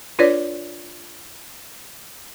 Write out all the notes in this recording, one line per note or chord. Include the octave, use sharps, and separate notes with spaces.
D4 F4 B4 C#5 D5